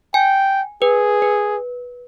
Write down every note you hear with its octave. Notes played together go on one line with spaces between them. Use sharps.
G5 G#5
G#4 B4
B4